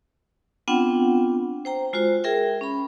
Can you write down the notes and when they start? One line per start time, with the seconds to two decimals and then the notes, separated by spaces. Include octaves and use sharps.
0.68 B3 C4 D4 F4 F#5 G5
1.65 C5 G5 A#5
1.93 G#3 F4 F#4 C5
2.24 G#4 A#4 E5 G5
2.61 C#4 B5